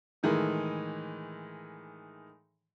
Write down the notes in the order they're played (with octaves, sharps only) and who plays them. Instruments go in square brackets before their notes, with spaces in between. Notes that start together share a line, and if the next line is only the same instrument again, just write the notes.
[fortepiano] A2 D#3 E3 G#3